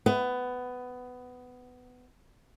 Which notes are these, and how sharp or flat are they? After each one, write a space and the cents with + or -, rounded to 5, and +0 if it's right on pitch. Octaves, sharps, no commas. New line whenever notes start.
B3 +15